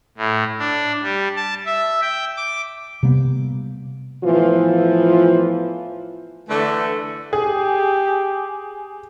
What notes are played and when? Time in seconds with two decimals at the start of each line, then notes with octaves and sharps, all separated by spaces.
0.18 A2
0.58 D4
1.02 G3
1.36 A5
1.66 E5
2.02 G5
2.36 D6
3.03 C3 G3 A#3 B3
4.24 A2 E3 F3 B3 F4
6.49 D3 E3 A3
7.33 G4 G#4